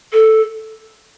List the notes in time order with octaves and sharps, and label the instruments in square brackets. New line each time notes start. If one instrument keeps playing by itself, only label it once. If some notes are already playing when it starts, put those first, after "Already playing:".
[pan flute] A4